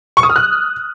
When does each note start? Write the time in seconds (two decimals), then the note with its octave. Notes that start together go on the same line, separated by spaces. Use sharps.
0.17 C#6
0.23 D#6
0.29 F6
0.36 F#6